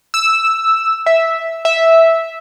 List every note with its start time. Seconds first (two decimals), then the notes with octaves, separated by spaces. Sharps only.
0.14 E6
1.06 E5
1.65 E5